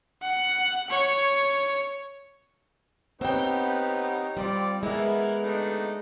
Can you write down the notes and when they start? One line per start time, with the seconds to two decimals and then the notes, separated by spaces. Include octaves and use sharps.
0.22 F#5
0.90 C#5
3.21 B3 C4 D#4 G4 B4 C#5 F#5 G5
4.37 G3 C4 F4 D5
4.83 E3 G#3 B3 E4 A#4
5.43 A3 D4 D#4